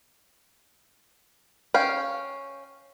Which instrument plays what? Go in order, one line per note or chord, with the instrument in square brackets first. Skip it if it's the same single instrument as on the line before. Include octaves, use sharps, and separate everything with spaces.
[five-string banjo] C#4 F5 G5